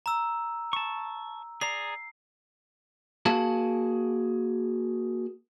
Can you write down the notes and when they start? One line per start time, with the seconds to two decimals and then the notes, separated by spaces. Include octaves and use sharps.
0.06 A#5 E6
0.73 A5 C#6
1.61 G#4 D5 A#5 C7
3.26 A#3 F#4 G#4 F5 A5